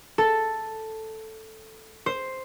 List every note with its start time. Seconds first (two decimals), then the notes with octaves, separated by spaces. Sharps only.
0.18 A4
2.06 C5